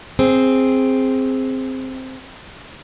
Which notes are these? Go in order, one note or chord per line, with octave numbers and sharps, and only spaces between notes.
C4 G#4